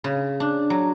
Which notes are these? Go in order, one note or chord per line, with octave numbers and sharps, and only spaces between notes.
C#3
D4
F#3